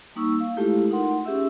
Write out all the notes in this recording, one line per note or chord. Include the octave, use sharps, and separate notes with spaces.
G3 A#3 D#4 C#6 E6
F5
G#3 A3 E4 F4 G4 A4
D#4 F4 A#4 F#5 C6
C#4 G4 G#4 E5 E6